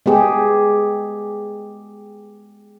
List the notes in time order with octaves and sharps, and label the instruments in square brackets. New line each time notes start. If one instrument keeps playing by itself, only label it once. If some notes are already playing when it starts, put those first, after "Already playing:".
[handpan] G#3 B3 G4 G#4